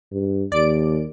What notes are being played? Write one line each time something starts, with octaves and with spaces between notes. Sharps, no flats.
G2
D#2 D5 D7